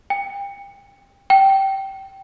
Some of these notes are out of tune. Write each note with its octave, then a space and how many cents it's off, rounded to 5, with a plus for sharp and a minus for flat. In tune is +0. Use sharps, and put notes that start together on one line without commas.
G5 +30
G5 -15